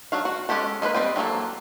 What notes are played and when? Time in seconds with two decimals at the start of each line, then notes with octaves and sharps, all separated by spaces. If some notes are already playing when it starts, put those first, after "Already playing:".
0.12 F#3 D4 F#4 F5
0.25 F#4
0.49 G#3 A#3 C#4 G4 A4
0.82 G#3 A#3 D4 B4
0.94 G3 C4 D#5 G5
1.16 E3 F#3 G#3 A#3 A4